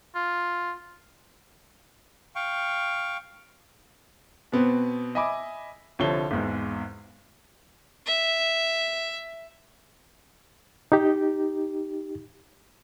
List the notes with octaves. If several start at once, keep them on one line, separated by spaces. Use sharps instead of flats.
F4
F5 G5 C#6
B2 B3 C4
D#5 E5 G#5 B5 D6
C2 D3 F3 C#5 A5 G7
G#1 E2 G#2
E5
D#4 G4